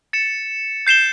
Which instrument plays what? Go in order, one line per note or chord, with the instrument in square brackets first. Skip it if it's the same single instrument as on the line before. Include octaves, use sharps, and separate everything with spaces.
[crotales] A6 C#7 E7
G6 C7 E7 G7